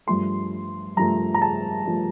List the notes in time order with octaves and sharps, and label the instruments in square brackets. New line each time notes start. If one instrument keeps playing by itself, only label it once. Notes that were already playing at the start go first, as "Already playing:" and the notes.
[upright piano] G2 F3 A3 C6
G2 F3 A3 A#5
A#5
A5
F3 A3